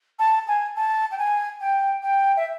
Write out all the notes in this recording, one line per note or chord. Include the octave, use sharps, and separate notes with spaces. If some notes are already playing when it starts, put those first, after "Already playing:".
A5
G#5
A5
G5
G#5
G5
G5
E5